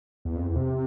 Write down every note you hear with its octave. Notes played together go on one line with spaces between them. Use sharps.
E2
F2
E2
C3